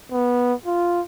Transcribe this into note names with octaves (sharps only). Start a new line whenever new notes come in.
B3
F4